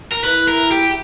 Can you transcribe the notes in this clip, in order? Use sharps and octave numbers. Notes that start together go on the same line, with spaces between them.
A#4
E4 B4
A#4
G4